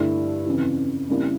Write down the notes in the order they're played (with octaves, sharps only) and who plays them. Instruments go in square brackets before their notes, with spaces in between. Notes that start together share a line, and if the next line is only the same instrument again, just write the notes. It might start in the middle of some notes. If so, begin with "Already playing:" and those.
Already playing: [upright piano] G2 D3 A3 E4
F2 C#3 E3
F2 C#3 G3 A#3 E4